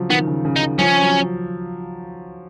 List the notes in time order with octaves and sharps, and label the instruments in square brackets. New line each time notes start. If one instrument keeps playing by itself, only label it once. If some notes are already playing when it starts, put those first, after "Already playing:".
Already playing: [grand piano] C#3 F3 F#3
[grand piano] D#3 [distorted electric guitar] B3
[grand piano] C#3
C#3
[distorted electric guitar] D#4
[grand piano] D#3
[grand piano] F3 [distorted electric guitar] C#4
[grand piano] F#3